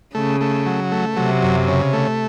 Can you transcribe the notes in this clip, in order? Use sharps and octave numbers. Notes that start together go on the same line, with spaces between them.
C#3 A3
A3
F#3
A3
C3 F#3
F#2
C#3
A3